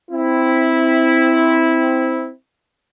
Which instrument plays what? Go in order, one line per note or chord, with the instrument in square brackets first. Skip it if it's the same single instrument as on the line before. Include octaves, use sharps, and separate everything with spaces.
[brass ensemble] C4 E4